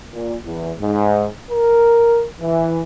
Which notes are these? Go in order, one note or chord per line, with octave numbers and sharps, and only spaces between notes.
A#2
E2
G#2
A#4
E3